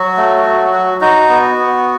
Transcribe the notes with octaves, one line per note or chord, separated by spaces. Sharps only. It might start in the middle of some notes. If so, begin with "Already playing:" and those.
Already playing: F#3 F#4
A3
F#3
F#4
D#4 F#4
B3
B3